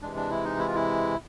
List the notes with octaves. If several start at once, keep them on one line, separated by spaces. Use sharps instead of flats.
C3 E3 G#3 D4
D4
E4
D#4
E4
F4
E4